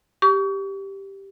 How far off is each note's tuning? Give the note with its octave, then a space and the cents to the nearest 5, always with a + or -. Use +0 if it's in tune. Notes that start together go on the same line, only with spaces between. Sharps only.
G4 +0 C#6 +40